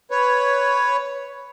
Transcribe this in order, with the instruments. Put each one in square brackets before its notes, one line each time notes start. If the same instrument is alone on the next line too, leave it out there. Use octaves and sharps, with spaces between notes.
[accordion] B4 C#5